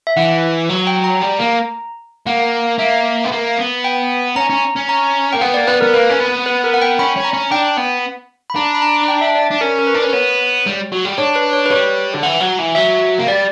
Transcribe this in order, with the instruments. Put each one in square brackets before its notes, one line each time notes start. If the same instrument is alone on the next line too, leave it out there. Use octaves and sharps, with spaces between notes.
[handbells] E5
[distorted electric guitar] E3 [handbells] F#5
[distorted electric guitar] F#3
[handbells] G5
A#5
[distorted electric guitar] G3
A#3
[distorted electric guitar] A#3 [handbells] F#5
[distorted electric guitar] A#3 [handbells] E5
[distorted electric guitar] B3
A#3
B3
[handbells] G5
[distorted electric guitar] C#4 [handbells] A#5
[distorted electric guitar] C#4
C#4
[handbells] A#5
[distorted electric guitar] A#3 [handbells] G5
[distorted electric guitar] B3 [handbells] F#5
[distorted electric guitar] A#3 [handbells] D5
[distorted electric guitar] B3 [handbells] B4
[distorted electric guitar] B3 [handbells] A#4
[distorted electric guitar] A#3 [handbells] B4
[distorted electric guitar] C#4
B3
[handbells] B4
A#4
F#5
G5
[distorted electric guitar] C#4 [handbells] B5
[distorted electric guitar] C#4
[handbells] A#5
[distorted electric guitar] C#4
[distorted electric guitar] D4 [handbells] G5
[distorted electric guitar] B3
[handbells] B5
[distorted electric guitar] D4 [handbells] A#5
[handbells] B5
A#5
G5
E5
D5
[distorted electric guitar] D4
[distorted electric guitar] C#4 [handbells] A#4
[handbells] A#4
B4
[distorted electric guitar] D4
[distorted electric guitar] C#4 [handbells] B4
[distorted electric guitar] B3 [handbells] C#5
[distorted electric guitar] G3
F#3
G3
[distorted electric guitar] D4 [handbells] C#5
[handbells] B4
C#5
B4
[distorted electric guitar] G3 [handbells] C#5
[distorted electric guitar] D3
[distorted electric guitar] E3 [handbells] F#5
[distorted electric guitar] F#3
E3
[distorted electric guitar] F#3 [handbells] E5
[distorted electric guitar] A#3
[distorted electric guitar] G3 [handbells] D5